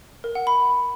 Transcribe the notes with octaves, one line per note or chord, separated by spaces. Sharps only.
A#4
F#5
B5